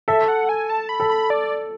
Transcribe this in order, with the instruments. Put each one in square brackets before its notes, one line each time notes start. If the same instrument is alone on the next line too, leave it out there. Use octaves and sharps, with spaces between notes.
[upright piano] A4 [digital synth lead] E5
[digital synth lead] F#5
G#5
A5
B5
[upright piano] A4
[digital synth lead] B5
D5